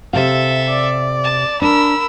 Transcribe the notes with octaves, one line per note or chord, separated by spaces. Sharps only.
C3 A4 E5 F5
D5
A5
D4 A#4 B5 E6